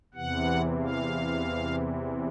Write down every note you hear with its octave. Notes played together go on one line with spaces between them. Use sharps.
E2 C3 E3 F#5
F5